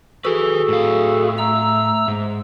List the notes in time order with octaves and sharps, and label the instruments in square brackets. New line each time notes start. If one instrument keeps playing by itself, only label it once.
[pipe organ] F#4 G#4 A4 [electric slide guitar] B4 G#5
[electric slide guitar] A2 F5
[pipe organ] A3 A#5 E6
[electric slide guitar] G#2